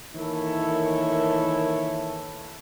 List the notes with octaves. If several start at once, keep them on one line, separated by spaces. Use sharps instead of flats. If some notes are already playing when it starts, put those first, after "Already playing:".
D#3 E3 A#3 E4 A4 C#5